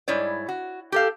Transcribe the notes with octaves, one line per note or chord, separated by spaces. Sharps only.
G#2 G3 E4 C#5 D5
F#4
G4 A4 F5